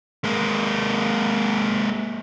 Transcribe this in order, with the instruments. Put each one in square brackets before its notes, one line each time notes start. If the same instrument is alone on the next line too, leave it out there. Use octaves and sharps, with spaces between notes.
[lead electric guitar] G#3 A#3